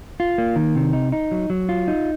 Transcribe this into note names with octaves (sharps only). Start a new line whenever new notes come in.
F4
A#3
D#3
C3
D#4
D#4
F#3
F#3
F4
D#4